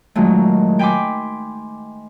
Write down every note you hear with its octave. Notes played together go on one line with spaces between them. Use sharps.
A#2 D#3 F#3 G#3 A3
G5 G#5 B5 C6 D6